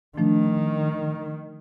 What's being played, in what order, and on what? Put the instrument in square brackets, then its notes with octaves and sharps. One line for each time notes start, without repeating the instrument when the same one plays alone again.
[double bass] D#3 [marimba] F3 A3 D4